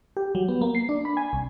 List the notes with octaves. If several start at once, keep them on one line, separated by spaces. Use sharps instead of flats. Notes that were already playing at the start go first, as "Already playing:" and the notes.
G4
F#3
B3
A#3
C7
D4
B5
G#5
C2